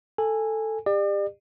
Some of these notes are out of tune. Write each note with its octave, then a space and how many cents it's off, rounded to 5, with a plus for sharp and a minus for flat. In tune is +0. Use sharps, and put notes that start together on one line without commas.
A4 +5 G#5 -10
G4 +35 D5 +40